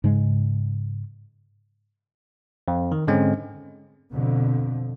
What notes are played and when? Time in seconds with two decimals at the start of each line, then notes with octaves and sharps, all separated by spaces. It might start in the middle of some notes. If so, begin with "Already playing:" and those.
0.04 G#2 C#3 G#3
2.68 F2
2.92 D#3
3.07 G#2 D3 G#3 C4 C#4
4.13 F2 B2 D3